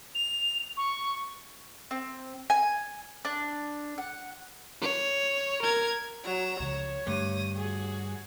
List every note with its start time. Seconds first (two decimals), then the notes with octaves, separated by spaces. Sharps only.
0.15 F7
0.77 C#6
1.91 C4
2.50 G#5
3.25 D4
3.98 F#5
4.81 C#5
5.62 A#4 G#6
6.25 F#3 A#5 E7
6.60 C#2 C#3 F3 C#5
7.07 G2 D3 A3 A#6 D#7
7.56 F#4 G#4